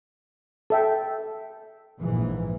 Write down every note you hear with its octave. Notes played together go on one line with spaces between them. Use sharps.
A4 E5 G5
A#1 G#2 E3